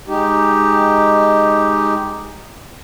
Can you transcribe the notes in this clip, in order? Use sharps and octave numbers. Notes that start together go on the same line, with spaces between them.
G#3 D#4 G4